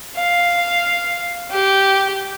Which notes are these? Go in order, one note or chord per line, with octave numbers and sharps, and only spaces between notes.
F5
G4